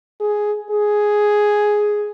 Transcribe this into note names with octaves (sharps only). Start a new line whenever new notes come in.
G#4
G#4